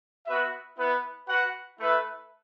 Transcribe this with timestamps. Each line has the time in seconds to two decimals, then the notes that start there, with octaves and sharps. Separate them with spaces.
0.27 B3 F#4 B4 E5
0.77 B3 E4 B4
1.28 F#4 B4 F#5
1.78 A3 E4 B4 E5